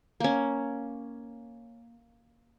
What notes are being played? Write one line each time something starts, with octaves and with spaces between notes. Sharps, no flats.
A#3 C#4